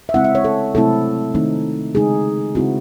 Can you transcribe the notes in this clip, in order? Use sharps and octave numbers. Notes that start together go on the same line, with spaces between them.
E5
C#3 G#3 C4 E4 F#5
E5
C#5
A4
C3 F#3 A3 C4 E4 A4
D#3 A3 C4 D#4
C#3 G#3 D#4 G#4
C#3 G#3 C4 E4 F#4